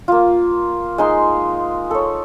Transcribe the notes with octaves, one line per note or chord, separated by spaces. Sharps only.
A#3 F4
G#3 D#4 C6
A4 C#5